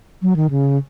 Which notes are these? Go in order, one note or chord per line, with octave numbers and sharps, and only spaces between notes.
F#3
D#3
C#3